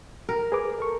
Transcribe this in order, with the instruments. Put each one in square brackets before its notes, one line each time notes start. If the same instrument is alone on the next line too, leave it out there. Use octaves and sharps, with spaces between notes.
[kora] A#4
[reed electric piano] G#4 B4 D6
A4 A#4 C#6